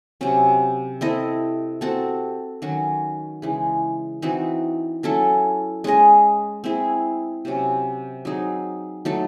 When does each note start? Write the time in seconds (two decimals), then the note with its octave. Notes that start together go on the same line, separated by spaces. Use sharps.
0.21 C3 F#3 C#4
1.01 C4 E4 A4 D#5
1.81 C4 F#4 A4
2.62 D#3 F#3 C#4 F#4
3.42 C#3 E3 G#3
4.22 E3 C4 D#4 F#4
5.03 F#3 C#4 E4 A4
5.84 G#3 C#4 G#4 D#5
6.64 C4 E4 G#4
7.45 C3 F#3 C#4
8.25 F#3 C4 D#4 G#4
9.05 F#3 A3 D#4 A4